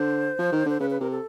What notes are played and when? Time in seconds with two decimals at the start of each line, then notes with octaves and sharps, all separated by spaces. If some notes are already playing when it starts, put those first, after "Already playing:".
Already playing: D3 C5
0.39 F3
0.53 D#3
0.66 D3 C5
0.80 C#3 B4
0.90 B4
1.00 C3 A#4
1.11 A4